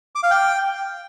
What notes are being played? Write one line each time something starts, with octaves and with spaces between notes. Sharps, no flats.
D6
F5
G5